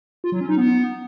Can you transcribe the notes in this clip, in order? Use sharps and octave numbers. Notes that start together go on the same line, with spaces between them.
F4
F#3
C#4
D#4
B3